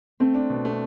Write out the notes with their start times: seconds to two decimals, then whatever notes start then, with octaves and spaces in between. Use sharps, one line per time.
0.20 A3 C4
0.35 D4
0.50 B2
0.65 A3